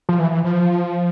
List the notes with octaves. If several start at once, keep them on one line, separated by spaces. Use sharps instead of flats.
F3
E3
F3